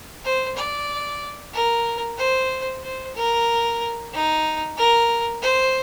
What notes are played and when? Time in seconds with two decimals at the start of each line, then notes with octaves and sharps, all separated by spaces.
0.25 C5
0.57 D5
1.54 A#4
2.18 C5
2.83 C5
3.15 A#4
4.13 D#4
4.77 A#4
5.42 C5